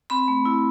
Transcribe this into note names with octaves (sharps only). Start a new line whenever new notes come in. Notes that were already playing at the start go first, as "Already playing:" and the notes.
C4 B5
A3
E4